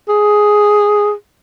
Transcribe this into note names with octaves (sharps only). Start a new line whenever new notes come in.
G#4